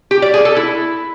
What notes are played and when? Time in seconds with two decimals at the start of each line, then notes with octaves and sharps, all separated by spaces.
0.11 G4
0.22 D5
0.34 G#4
0.45 A4
0.57 E4